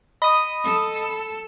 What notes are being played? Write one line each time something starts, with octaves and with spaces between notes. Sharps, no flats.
D#5 B5 D#6
A4